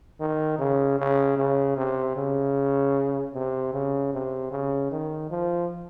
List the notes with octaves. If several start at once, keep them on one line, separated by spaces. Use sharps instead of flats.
D#3
C#3
C#3
C#3
C3
C#3
C3
C#3
C3
C#3
D#3
F3